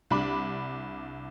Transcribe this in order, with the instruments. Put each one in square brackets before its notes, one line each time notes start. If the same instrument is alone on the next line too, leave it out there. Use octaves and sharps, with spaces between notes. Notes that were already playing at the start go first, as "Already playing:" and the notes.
[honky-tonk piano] C2 D4 B5 D6